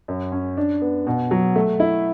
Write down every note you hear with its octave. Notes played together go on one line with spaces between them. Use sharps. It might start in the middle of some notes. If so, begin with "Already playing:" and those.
F#2
C#4
D4
B3
B2
F#3
A3
E4